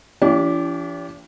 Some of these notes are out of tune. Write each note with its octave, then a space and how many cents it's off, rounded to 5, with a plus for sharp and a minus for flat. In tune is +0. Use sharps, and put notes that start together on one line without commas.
E3 +40 D4 -40 G4 +0